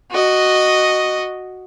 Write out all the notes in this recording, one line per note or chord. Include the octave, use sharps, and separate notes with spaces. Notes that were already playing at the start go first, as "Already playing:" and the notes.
F#4 D#5